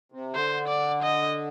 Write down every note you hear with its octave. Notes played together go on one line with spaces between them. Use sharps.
C3
D3 C5
D5
D#5